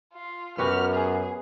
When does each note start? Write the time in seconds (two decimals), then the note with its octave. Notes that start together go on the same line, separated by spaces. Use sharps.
0.14 F4
0.58 F#2 B3 F#4 G4 F6
0.94 G#4